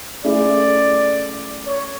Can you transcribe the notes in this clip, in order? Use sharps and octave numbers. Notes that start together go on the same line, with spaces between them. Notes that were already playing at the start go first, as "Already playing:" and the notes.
A3 C#4 E4 G#4 D5
C#5